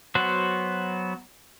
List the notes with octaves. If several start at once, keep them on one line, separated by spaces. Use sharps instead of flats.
F#3 B3 F#4 C5